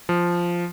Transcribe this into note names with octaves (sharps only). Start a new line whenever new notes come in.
F3